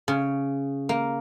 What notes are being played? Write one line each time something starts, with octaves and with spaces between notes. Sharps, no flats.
C#3
A#3